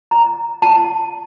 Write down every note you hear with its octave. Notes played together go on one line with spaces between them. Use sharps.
A#5
A5